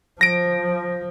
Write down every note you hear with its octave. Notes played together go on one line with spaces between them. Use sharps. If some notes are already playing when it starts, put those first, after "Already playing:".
F3 A#6 D7